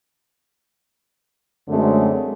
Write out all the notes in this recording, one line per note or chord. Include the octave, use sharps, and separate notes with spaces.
F#2 D3 F#3 G#3 A3 C4